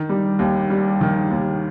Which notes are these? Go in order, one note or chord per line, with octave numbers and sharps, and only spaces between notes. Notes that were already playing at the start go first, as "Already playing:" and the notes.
Already playing: D#3
G3
D#2
G3
D#3
D#2